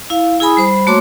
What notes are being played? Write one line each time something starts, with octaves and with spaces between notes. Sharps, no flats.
E4 F5
E4 G#4 G#5 B5 D#6
G3 C5 B5
A3 A#3 F#4 C#5 C6 D6